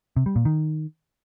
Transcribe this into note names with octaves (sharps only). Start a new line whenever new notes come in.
C3
G3
A#2
D#3